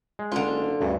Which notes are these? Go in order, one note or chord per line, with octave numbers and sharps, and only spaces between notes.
G#3
C#2 D3 F4
F#1
D2 G2 C#3